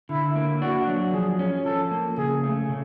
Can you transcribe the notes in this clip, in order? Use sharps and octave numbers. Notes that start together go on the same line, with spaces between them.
D3 E4
A#3
D4 F#4
F#3
F3 G#4
C#4
F3 A4
A#3
C#3 G#4
A3
C#3